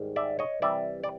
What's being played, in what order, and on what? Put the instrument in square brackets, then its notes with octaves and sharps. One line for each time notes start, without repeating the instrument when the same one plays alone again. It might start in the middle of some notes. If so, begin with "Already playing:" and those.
Already playing: [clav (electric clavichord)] G#2 D#3 G3
D5 E5
C#5 D#5
C3 E3 G3 D5 E5
D5